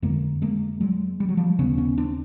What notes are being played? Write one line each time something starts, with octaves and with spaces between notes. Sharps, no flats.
F2 D3 G#3 A#3
G#3 A#3
F#3 G#3
G3
F#3
F3 G3
D#2 C#3 B3 C#4
B3 C#4
C4 D4